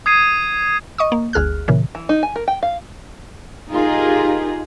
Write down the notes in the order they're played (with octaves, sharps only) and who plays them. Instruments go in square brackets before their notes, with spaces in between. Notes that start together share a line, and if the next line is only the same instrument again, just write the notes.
[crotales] D#6 G#6 C7 D#7
[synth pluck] D#5 C#6 D#6
A#3
G1 D2 G#4 F6 F#6
A#2 C#3 E3
[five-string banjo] E3
D#4
G#5
A#4
G5
F5
[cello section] D#4 F4 G4 G#4 A#4